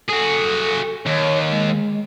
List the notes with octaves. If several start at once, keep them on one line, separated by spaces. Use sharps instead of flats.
F#4 G#4 A4
D#2 C#5
G#3